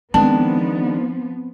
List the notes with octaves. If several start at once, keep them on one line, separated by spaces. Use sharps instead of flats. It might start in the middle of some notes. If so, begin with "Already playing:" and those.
D#3 F3 G#3 B3 C4 D4 A5